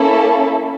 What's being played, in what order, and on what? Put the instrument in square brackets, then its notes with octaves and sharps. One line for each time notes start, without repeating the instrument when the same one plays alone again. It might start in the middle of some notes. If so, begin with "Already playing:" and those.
Already playing: [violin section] A#3 C#4 E4 A4